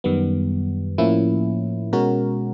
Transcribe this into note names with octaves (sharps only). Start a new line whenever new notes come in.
F#2 D#3 G3 B3
A2 F3 A#3 C#4 E4
B2 G#3 C#4 F#4 A#4